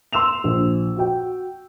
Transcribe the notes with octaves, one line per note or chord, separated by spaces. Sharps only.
C6 E6 E7 F7
A#1
F#4 G5